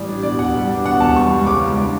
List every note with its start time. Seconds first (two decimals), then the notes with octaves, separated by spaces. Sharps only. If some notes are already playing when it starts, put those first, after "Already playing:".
Already playing: A1 G3 D5
0.08 D4
0.23 B2 D5
0.38 E2 F#5
0.55 G3
0.70 D4
0.85 B2 F#5
1.00 E2 A5
1.15 G3 C#6
1.31 C#2
1.46 C#3 D6
1.63 C#2
1.77 D4